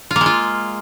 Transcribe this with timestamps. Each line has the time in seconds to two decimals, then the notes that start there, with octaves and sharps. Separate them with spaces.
0.11 F4
0.16 A#3
0.21 G#3
0.26 F4